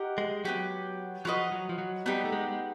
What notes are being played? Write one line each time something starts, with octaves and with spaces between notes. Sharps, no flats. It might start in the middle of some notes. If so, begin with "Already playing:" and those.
Already playing: G4 A#4 D#5 F#5
G#3
F#3 B3 D#4 G4
F3 F#4 B4 D#5
F#3
F3
F#3
G3 B3 D#4 G4
A3
G#3
G#3